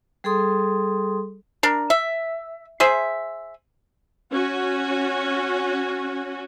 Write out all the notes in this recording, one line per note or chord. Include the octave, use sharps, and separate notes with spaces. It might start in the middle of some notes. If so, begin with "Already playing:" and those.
G3 G#4 A4 C6 D#6
D4 A#4
E5
G#4 C5 E5
C#4 F#4